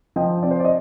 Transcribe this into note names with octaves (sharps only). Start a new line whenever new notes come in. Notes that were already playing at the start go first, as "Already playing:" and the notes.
F3 D#5 G5
C4 D5
C5
D5
D#5